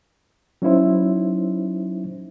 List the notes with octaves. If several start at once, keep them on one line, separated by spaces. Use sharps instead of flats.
F#3 C#4 D#4 E4 C5 E5